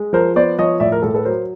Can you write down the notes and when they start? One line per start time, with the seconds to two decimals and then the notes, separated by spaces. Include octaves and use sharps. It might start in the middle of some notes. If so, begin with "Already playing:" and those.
Already playing: G#3
0.13 F3 A#4 C5
0.36 B3 C5 D5
0.58 F3 C#5 D#5
0.80 A2 D5 E5
0.92 A#4
1.02 A2 A4
1.14 A4 B4
1.25 F#3 A#4 C5